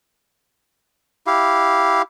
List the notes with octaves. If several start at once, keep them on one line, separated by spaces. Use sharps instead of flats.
E4 G4 F5